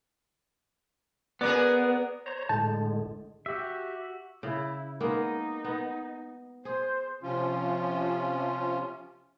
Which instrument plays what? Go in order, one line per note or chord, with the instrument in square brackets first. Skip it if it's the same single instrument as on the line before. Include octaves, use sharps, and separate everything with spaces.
[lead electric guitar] B3 [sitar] G#4 A#4 D5
[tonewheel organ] C5 C#5 A#5
[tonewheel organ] A2 D3 G#3 [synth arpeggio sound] A5 G6 A6
[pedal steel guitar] F#4 E5 [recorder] G4
[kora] C#3 [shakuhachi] E4
[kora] G#3 A#3 B3 [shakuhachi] D#4
[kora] B3
[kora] G#4 [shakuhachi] C5
[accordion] C3 F3 C#4 F4